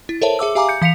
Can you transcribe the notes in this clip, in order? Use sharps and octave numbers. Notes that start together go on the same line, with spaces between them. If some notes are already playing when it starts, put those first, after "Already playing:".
E4
A4 A#4 C5 C#5 E5 A5
G#4 E5 D6 E6
G4 E5 F5 G#5 A#5 D6
G6 C#7
E3 F5 B6 C#7 F7